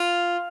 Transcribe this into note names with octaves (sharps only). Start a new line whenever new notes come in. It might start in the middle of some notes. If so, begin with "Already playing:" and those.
Already playing: F4